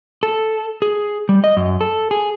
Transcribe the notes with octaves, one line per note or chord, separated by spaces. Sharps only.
A4
G#4
G3
D#5
F#2
A4
G#4